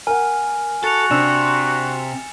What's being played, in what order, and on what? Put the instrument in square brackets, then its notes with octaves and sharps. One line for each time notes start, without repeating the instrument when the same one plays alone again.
[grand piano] A#4 F#5 [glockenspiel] G#5 F6
[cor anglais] F#4 [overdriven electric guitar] A4 [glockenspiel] A6 C#7 F7
[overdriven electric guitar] C3 [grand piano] D4 E6 [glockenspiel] E7